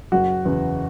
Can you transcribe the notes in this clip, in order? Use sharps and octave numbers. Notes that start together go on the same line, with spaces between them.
F#1 F#4
E2 C#3